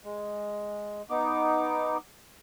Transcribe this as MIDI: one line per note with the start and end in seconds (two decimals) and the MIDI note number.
0.04 1.02 56
1.10 1.97 59
1.10 1.97 63
1.10 1.97 86